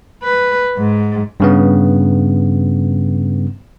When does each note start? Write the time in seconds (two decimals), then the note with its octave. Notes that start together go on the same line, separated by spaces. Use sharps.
0.23 B4
0.78 G#2
1.40 G2 C#3 B3